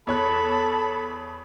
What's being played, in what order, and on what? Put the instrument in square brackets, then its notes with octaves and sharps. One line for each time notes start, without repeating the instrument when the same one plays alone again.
[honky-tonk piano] E2 C#5 F#6 [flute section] A4 A5 B5